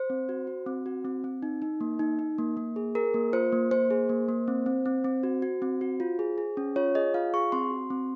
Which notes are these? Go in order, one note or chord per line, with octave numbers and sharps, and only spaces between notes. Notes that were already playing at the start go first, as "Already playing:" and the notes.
Already playing: C5
C4
F#4
F#4
C4
F#4
C4
C4
D#4
D#4
A#3
D#4
D#4
A#3
A#3
G#4
G#4 A#4
A#3
F4 C5
A#3
A#3 C5
G#4
A#3
A#3
C4
C4
C4
C4
F#4
F#4
C4
F#4
F4
G#4
G#4
C#4
F4 C#5
G#4 D#5
F4 F5
G#4 C#6
C4 C6
F#4
C4